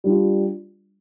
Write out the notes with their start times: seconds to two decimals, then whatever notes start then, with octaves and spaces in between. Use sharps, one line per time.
0.04 G3 D4 F4